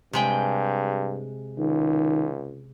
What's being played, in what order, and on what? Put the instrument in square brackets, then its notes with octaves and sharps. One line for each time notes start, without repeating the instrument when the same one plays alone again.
[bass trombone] G2 [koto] C3 G#3 G5
[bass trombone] C#2 [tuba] D#3